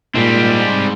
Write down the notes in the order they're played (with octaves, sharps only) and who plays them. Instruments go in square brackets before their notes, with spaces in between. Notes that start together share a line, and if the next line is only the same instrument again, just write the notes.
[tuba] A#2 [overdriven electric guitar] G3 C4 [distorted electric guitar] G#3 D#4